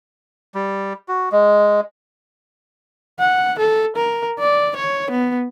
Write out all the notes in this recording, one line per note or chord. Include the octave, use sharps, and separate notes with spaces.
G3
F#4
G#3
F#5
A4
A#4
D5
C#5
B3